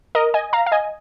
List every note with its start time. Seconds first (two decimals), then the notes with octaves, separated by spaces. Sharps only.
0.15 A#4 D#5
0.34 D#5 G#5
0.53 F5 A#5
0.66 F5
0.72 D#5 G#5